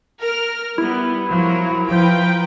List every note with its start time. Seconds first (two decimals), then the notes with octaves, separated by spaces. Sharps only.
0.20 A#4 F6
0.78 G3 B3 E4
1.30 F3 F#3 A#4
1.89 F3 B4 G5 A#5